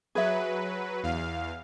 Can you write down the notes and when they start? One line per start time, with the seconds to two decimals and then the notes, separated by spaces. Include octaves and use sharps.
0.15 F#3 G#4 B4 E5
1.03 E2 F5